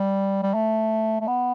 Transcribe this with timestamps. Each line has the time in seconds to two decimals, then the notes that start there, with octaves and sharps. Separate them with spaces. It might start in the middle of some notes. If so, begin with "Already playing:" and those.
Already playing: G3
0.43 G3
0.54 A3
1.20 A3
1.27 B3